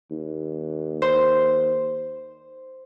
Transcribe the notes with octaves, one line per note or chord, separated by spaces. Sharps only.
D#2
C5